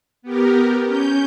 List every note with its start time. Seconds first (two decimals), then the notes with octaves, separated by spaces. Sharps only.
0.22 B3 G4 A#4
0.86 C#4 G6